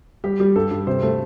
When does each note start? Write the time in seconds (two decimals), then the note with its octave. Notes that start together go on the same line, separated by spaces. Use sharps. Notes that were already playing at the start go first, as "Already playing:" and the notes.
0.24 G3 G4
0.40 G3
0.56 G2 A4
0.71 G2
0.87 C3 C5
1.03 A3